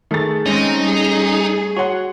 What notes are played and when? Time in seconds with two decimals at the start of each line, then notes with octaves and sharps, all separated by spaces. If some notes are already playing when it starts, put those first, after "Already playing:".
0.11 D#3 A3 G#4 A6
0.46 G#3 C4 C#4 D#4
0.81 G3 G#4
1.77 F#4 C#5 F#5 C6